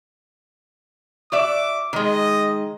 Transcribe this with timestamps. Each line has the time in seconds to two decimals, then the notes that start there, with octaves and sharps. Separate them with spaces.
1.32 F#4 D5 E5 D6
1.93 D#3 G#3 D#5